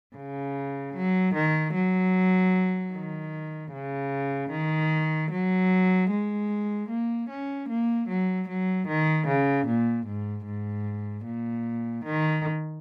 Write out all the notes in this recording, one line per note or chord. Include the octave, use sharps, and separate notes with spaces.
C#3
F#3
D#3
F#3
D#3
C#3
D#3
F#3
G#3
A#3
C#4
A#3
F#3
F#3
D#3
C#3
A#2
G#2
G#2
A#2
D#3